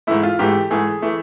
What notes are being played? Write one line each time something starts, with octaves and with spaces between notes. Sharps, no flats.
G#2 E3 A3 E4
F4
G#2 E3 A3 G4
G#2 E3 A3 G#4
E3 A3